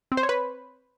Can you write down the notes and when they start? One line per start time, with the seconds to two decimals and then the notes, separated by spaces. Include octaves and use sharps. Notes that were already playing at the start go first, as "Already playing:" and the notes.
0.12 C4
0.17 C5
0.23 C#5
0.29 B4